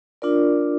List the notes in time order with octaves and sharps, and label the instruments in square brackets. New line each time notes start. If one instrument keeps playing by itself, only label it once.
[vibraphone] D4 F4 A#4 D5